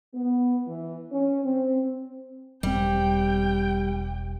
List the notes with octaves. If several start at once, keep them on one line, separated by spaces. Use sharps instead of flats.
B3
E3
C#4
C4
E1 G3 C4 G5